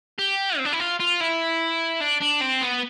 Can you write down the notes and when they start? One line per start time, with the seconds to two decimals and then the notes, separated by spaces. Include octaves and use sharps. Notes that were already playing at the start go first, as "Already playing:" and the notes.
0.19 G4
0.58 C4
0.65 D4
0.73 E4
0.80 F4
1.00 F4
1.20 E4
2.01 D4
2.22 D4
2.41 C4
2.62 B3